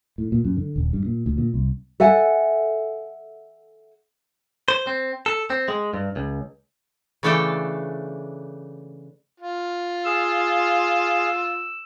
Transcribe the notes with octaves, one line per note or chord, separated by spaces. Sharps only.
A2
A#2
F#2
D3
D#1
G2
A#2
D2
A#2
C2
A4 E5 F#5 G#5
C5
C4
A4
C4
G#3
G2
C#2
C#3 E3 A3 D4 A4 G5
F4
G#4 F5 E6